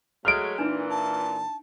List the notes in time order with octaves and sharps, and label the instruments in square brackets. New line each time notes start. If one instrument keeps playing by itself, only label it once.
[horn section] F#3 G#3 A3 [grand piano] F6 D7
[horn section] A#2 E3 [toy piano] D4 D#4 B4
[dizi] A5